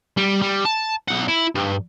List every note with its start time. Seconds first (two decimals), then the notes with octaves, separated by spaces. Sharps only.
0.17 G3
0.41 G3
0.65 A5
1.08 B1 F#5
1.28 E4
1.55 G2